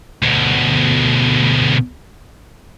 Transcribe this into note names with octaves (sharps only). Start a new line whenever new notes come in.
D2 B2